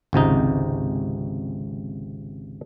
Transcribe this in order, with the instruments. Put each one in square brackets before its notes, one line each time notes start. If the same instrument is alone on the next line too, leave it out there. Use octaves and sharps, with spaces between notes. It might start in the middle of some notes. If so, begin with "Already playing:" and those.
[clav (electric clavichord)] G#1 C#2 C3 D#4